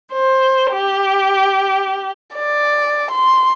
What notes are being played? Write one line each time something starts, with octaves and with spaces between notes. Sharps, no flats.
C5
G4
D5
C6